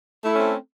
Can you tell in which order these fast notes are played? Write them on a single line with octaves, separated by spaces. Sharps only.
A3 E4 A4 C#4 C4